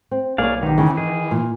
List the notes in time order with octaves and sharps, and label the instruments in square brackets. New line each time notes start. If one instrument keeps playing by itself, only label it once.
[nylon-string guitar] C4
[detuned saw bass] B1 [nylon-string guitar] A#3 C#5 [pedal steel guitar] G#4 D5 F5
[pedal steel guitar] D#3 [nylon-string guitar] B3 G4
[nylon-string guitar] E2 C#3 [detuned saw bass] E3
[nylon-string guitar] D#3 [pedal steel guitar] G#4
[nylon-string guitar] A#2